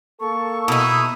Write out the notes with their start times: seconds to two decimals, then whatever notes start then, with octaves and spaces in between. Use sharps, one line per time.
0.20 A#3 A4 C#6
0.68 B2 D#4 E4